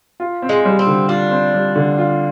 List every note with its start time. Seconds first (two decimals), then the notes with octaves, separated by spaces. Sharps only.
0.20 F4
0.42 C4
0.49 G#3
0.65 G3
0.79 C4
0.87 D3
1.09 D4 F4
1.31 C4
1.54 G3
1.76 D3
1.98 F4